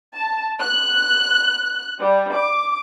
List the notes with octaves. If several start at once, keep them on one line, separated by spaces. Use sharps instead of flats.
A5
F#6
G3
D6